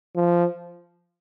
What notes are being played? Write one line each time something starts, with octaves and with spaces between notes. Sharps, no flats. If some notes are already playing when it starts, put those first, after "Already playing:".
F3